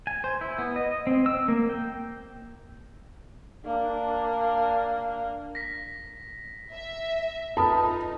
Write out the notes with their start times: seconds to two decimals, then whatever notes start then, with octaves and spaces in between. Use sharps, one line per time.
0.07 G#5
0.24 C5
0.41 E4
0.59 B3
0.76 D#5
1.07 C4
1.26 E6
1.48 A#3
1.69 G5
3.65 A#3 D4
5.55 A#6 B6
6.73 E5
7.57 D#4 F4 A4 B4 A5